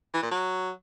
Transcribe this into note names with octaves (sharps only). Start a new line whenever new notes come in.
E3
A#2
F#3